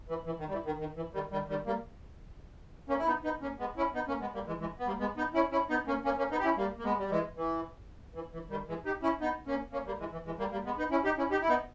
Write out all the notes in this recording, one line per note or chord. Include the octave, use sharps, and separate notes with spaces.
E3
E3
D#3
G3
E3
D#3
D#3
E3
D#3 G3
D#3 G3
D#3 G3
G3 A#3
A#3 C#4
E4
B3 D#4
B3 D#4
A#3 C#4
G#3 B3
C#4 E4
B3 D#4
A#3 C#4
G#3 B3
G3 A#3
E3 G#3
E3 G#3
B3
G3 A#3
G#3 B3
B3 D#4
C#4 E4
C#4 E4
B3 D#4
A#3 C#4
A#3 C#4
A#3 C#4
B3 D#4
G4
C#4 E4
G3 A#3
A#3
G#3 B3
G3
E3 G#3
E3
E3
E3
D#3 G3
E3 G#3
D#4 G4
C#4 E4
B3 D#4
A#3 C#4
A#3 C#4
G3 A#3
E3 G#3
E3
E3 G#3
G3 A#3
G3 A#3
G#3 B3
B3 D#4
C#4 E4
D#4 G4
C#4 E4
D#4 G4
E4
B3 D#4